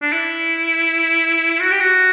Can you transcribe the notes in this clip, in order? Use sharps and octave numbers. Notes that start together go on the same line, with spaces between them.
D4
E4
F#4
G4
F#4